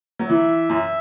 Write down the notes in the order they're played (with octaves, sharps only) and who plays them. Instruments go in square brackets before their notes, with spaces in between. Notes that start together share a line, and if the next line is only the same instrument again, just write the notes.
[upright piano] F#3
[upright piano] E3 [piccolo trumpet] E5
[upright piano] F#2